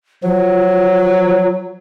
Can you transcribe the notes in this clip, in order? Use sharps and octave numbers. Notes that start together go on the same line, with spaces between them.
F3 F#3 F4